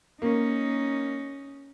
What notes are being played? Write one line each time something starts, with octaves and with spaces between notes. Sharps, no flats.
A#3 C#4 D#4